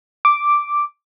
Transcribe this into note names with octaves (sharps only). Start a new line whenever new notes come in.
D6